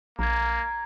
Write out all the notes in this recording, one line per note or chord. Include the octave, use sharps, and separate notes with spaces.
A#1 A#3 A#5 G#6